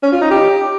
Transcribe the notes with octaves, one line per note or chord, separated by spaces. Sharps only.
C#4
F4
D#4
G4